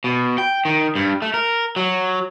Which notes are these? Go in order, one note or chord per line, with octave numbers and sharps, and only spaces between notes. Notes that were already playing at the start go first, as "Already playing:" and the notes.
B2
G5
D#3
G2
A3
A#4
F#3